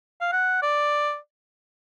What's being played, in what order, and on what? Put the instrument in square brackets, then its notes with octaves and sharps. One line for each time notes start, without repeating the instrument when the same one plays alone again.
[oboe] F5
F#5
D5